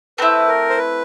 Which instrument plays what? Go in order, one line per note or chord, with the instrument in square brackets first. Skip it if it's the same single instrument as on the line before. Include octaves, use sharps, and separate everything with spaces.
[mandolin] A3 C4 E4 [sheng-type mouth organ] B4
[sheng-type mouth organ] A#4
C5
B4